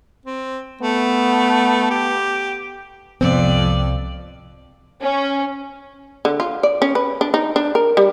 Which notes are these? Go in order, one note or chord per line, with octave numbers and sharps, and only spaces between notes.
C4
A3 B3
G4
C2 F2 G#2 F3 B3 C4 D5
C#4
D3
F4
D5
C#4
B4
D4
D#4
D4
A#4
G3